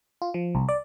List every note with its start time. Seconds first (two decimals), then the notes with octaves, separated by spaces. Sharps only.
0.22 F4
0.34 F3
0.55 C2
0.69 D5